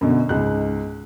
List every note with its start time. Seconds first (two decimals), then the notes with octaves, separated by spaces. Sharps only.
0.01 F#2 B2 D3
0.29 C#2 G#2 F#6